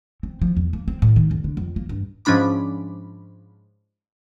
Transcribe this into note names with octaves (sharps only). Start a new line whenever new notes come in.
C4
F3
E2
A#3
C4
A2
D#3
F1
D3
F2
A#3
G2
G#2 F3 C#4 D4 B5 D6